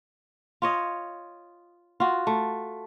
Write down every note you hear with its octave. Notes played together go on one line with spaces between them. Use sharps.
F4 C#5 D#5
F4 F#4
A3